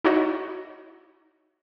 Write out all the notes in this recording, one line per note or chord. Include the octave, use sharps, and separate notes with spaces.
D#4 E4 F#4 C#5 D#5